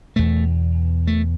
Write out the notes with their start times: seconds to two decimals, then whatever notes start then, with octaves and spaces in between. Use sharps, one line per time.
0.16 E2 B2 A3
1.07 A3